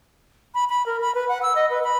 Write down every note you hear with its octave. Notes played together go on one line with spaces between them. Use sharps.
B5
B5
A#4
B5
B4
F#5
E6
D#5
B4
B5